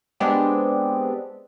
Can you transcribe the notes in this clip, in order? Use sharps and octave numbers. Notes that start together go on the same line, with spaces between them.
G#3 B3 C4 D4 G4